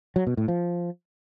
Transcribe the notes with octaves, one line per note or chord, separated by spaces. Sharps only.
F#3
B2
A2
F3